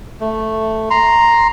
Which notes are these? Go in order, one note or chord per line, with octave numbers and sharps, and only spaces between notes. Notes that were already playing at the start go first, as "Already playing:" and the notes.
A3
A#5 C6